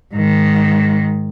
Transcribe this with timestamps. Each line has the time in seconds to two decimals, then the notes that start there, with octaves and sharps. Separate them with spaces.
0.13 G#2 D#3